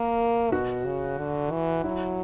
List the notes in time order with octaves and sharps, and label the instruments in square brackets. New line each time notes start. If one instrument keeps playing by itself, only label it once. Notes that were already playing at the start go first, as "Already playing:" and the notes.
Already playing: [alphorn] A#3 [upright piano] A#4
[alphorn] B2 [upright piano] F#4
[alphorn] C#3
D3
E3
[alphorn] F#3 [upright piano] E4